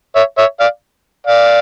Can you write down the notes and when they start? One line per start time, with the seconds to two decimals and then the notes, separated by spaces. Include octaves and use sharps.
0.15 C#5 E5
0.38 C#5 E5
0.60 D5 F5
1.27 D5 F5